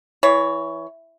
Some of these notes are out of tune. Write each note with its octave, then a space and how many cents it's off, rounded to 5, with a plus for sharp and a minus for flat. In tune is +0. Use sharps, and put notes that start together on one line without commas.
E3 +0 C#5 +20